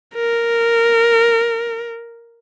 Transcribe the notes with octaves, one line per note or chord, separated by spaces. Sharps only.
A#4